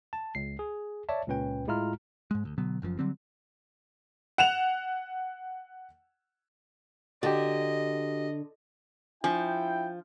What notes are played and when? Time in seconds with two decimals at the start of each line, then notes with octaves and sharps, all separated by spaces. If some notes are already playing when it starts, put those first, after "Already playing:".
0.13 A5
0.35 C#2 C7
0.59 G#4
1.09 C#5 D5 E5 A5
1.27 C#2 A#2 C#4 B4 G5
1.67 A2 G#3 E4 F4 A#5 F6
2.31 G#2 G#3
2.45 D2
2.58 B2 D3 F#3 B3
2.82 F#1 F#2 C#3 F3
2.99 D3 F#3 G3 C4
4.38 F#5 E7 F7
7.23 D3 F#4 G4 D#5
9.24 F3 D4 E4 G5